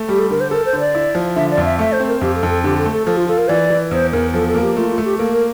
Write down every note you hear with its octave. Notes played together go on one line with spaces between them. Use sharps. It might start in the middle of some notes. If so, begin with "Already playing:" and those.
Already playing: A3
G3 G4
A4
D3 A#4
C5
A4 A#4
C5
D3
D5
E4
F3
D3 E5
D5
F2
E5
A3 E5
C5
C4
A#4
F2 G4
A4
F2
A4
D3 G4
A4
A3
A4
F3 A4
F4
F4 A4
A#4
E3 D5
E3
E2 C5
E2 A#4
F3 A4
A4
A#3
G4
A3 F4
F4
A3
G4
A#3 A4
A#4